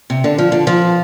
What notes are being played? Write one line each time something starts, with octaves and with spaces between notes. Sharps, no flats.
C3
D3
F3
D3
F3